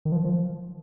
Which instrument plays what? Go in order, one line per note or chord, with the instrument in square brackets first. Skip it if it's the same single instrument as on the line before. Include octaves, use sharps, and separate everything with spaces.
[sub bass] D#3
F3
F3